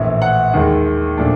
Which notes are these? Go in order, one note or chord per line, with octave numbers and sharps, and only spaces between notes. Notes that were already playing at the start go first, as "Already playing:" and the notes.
Already playing: A#1 A2 E3
F#5
D#2 D#3 G#3
A#2 F3 A3 D4